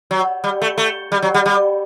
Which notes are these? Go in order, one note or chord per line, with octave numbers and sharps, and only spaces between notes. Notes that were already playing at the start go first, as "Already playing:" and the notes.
F#3
G3
A3
A3
G3
F#3
G3
G3